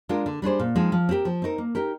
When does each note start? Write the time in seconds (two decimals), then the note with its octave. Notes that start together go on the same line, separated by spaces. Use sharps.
0.09 G#3 D4 F4 A#4
0.26 D3
0.42 G3 D4 G#4 C5
0.59 A#2
0.76 F3 G#3 C4 D#4
0.92 F3
1.09 C4 G4 A#4
1.25 F3
1.42 C4 D#4 A#4
1.58 A#3
1.75 D#4 G4 A#4